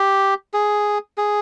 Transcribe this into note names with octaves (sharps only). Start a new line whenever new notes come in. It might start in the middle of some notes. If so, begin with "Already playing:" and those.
Already playing: G4
G#4
G#4